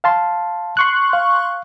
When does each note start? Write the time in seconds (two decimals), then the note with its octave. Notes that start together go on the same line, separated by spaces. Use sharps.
0.04 F5 A5 C6
0.77 C6 C#6 F#6
1.13 F5